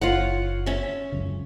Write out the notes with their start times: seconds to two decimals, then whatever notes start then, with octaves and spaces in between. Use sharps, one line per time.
0.01 F#1 F4 C#5 F#5
0.66 C#4 E5
1.12 C#2 F#2 C#3